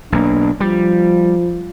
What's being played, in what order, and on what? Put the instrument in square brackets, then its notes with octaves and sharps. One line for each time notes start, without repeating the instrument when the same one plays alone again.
[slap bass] B1 A#3 [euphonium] D4
[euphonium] F3 [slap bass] G3